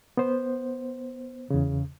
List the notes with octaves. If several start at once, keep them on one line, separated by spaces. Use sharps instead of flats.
B3 C5
E2 C#3